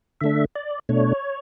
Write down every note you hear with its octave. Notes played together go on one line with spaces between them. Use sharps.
D3 A3 D4 E5
D5
B2 A3 D4 C#5